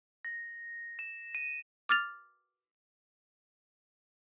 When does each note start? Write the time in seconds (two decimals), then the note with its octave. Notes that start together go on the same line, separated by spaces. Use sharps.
0.25 A#6
0.99 E7
1.35 D#7
1.89 D6 F6 A6 F7